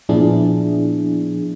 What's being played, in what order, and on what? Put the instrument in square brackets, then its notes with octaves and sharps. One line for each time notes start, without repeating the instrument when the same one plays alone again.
[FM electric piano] A#2 F3 B3 D4 E4 G#4